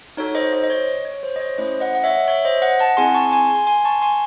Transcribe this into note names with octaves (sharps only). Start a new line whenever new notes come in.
D#4 F#4 A4 C#5
C5 D#5
C5 D#5
D#5
C#5
C#5
C5
D#5
C#5
A3 C#4 E4 C5 D#5
D#5 F#5
F#5
C#5 E5
C#5 E5
C5 D#5
D#5 F#5
F#5 A5
C4 E4 G#4 G#5 C6
A5 C#6
G#5 C6
G#5 C6
G#5 C6
A5 C#6
G#5 C6